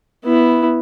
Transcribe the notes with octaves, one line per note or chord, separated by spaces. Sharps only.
B3 E4